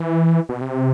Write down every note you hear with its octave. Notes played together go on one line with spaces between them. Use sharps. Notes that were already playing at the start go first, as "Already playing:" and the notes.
Already playing: E3
B2
C3